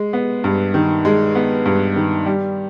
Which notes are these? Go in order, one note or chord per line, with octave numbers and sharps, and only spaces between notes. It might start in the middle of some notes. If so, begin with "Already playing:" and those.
Already playing: G#3
B3
G2
D#3
G#3
B3
G2
D#3
G3